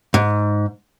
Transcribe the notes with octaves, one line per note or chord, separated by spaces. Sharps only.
G#2